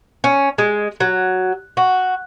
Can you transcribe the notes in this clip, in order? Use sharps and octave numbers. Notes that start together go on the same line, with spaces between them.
C#4
G#3
F#3
F#4